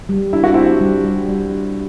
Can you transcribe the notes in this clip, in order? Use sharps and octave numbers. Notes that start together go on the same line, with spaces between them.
G3
D4 E4
F#4
C4 E4 G4
G3
G3
G3
D4